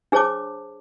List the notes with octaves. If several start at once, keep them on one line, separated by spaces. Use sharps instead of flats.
D4 G#4 C5 C#5 A5 D6